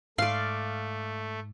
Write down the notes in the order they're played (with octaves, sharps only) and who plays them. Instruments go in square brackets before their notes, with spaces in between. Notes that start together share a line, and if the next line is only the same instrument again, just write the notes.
[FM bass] G#2 [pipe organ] A3 [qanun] D5 C6 [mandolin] F5